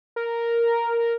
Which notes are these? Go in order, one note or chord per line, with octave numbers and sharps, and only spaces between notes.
A#4